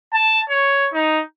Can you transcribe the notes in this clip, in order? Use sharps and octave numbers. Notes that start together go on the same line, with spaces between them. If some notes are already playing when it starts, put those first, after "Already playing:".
A5
C#5
D#4